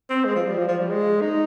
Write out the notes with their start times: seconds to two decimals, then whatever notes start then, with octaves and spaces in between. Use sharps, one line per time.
0.10 C4
0.25 G#3
0.36 F3
0.47 G3
0.58 F3
0.68 F3
0.79 G3
0.90 G#3
1.21 D#4